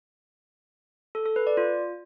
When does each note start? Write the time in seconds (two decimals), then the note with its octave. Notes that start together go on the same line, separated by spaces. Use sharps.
1.15 A4
1.25 A4
1.36 B4
1.47 D5
1.57 F4